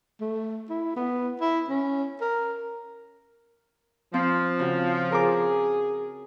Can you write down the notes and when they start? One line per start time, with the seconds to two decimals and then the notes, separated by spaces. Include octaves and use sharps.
0.21 A3
0.70 E4
0.96 B3
1.41 E4
1.69 C#4
2.21 A#4
4.14 F3 C4
4.59 C#3 F#4
5.12 G#4 A#4 D6